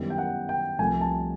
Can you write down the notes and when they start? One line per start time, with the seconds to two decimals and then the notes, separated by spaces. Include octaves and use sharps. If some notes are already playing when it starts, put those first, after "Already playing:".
Already playing: F#2 D#3 G3 B3 E4
0.10 G5
0.18 F#5
0.49 G5
0.78 C2 C3 F3 A3 G#5
1.01 A5